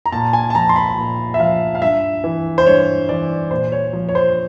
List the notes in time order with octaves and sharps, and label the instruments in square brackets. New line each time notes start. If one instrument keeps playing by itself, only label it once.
[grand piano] A#5
A#2 A5
G#5
A5
F3 A#5
C6
B5
A#2
E5
F3 F5
F5
G2 E5
E3
C5
G2 C#5
E3 D5
A#2 C5
C#5
F3
C#5
C5